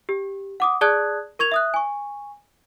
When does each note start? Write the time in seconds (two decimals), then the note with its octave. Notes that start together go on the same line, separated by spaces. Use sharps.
0.09 G4
0.60 F#5 D6 D#6
0.81 G#4 D5 A5 D#6 F#6 G#6
1.39 A#4 C#6 G#6 F7
1.52 E5 D#6 F#6
1.74 G#5 C#6